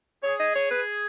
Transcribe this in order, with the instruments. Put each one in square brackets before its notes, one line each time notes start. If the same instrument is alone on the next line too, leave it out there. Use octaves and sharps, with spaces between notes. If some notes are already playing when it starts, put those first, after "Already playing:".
[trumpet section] G#4 [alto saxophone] C#5
[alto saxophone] D#5
C#5
B4